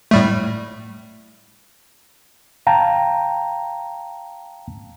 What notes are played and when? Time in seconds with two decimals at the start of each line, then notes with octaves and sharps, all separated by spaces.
0.11 A2 G3 A3
2.67 F5 G5 A5 A#5